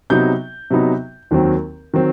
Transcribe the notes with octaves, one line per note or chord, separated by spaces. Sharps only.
C3 F#3 B3 D#4 G6
C3 F#3 B3 D#4
D#2 D#3 F#3 C4
D#3 F#3 C4